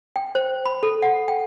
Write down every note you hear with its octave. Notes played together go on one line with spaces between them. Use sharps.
G5
C5
B5
A4
F#5
G5